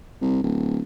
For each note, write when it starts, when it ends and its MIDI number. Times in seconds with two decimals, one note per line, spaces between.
0.21 0.41 36
0.43 0.81 26